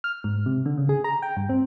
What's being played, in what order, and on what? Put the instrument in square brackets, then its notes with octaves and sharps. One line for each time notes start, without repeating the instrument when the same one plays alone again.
[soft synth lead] F6
G#2
C3
D3
C#3
G#4
A#5
G5
G2
C4